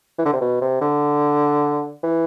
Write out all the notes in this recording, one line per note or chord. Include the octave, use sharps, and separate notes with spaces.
E3
D3
C3
B2
C3
D3
E3